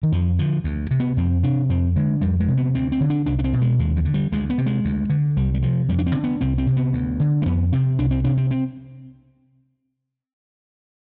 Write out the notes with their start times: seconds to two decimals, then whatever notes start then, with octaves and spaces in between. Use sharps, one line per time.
0.03 D#3
0.12 F2 F3
0.39 D3 F3
0.64 D2
0.91 C3
1.00 B3
1.17 F2 C4
1.43 C3 D4
1.69 F2 C4
1.96 D3 G#3
2.21 F2 G3
2.40 G#3
2.48 C3
2.57 B3
2.74 D2 C4
2.92 C4
3.01 D3
3.10 D4
3.26 C2 D4
3.39 D4
3.44 C4
3.53 B2
3.62 G#3
3.79 D#2 G#3
3.97 F3
4.05 D3
4.14 G3
4.32 D2 G#3
4.50 B3
4.58 C3
4.66 G#3
4.85 D2
5.10 D3
5.37 C2 G3
5.54 G3
5.62 C3 F3
5.89 F2 G3
5.99 D4
6.07 C4
6.15 D3
6.24 B3
6.41 C2 C4
6.58 C4
6.67 C3
6.77 B3
6.93 D2
7.20 D3
7.42 G#3
7.46 F2 B3
7.73 C3 C4
7.99 C2 D4
8.11 C4
8.24 C3 D4
8.37 C4
8.51 C4